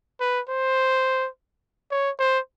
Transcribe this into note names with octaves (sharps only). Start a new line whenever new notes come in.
B4
C5
C#5
C5